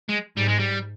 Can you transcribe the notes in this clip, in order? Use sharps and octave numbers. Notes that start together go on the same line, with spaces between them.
G#3
G#2 G3
G#3
G3